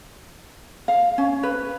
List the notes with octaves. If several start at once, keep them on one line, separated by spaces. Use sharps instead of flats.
F5
C#4
B4